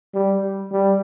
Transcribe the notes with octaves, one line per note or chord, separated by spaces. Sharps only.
G3
G3